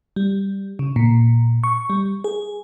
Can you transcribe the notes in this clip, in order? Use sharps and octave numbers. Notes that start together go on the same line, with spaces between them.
G3
C#3
A#2
C#6
G3
G#4